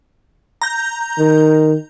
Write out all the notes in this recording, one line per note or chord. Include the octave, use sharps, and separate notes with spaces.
A#5 G6
D#3